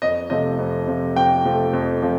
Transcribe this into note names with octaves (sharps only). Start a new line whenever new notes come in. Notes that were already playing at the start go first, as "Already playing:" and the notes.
F2 D#5
C3 F3 A3 D#5
F2
C3 F3 A3
F2 G5
C3 F3 A3
F2
C3 F3 A3